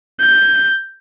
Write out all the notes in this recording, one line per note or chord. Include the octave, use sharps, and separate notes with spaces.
G6